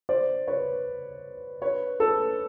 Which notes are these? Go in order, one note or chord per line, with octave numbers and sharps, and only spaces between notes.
C5 D5
B4 C#5
B4 C#5
A4 B4